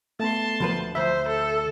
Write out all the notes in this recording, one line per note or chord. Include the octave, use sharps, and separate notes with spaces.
A3 B3 A5 C6
D2 F3 B4
D2 C5 E5
A4